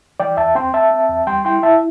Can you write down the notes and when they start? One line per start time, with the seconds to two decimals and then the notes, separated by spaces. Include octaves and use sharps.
0.20 E3 D5 G5
0.37 E2 E5 A5
0.55 C4 G5 C6
0.73 C4 E5 A5
0.91 C4
1.09 E2
1.27 G3 G5 C6
1.45 E4 G5 C6
1.63 E4 E5 A5